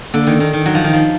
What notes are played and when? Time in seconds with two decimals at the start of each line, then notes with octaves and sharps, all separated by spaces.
0.14 D3 A#3
0.27 D#3
0.40 D#3 D4
0.53 D#3
0.66 F#3 D#4
0.75 F3
0.84 D#3
0.93 F3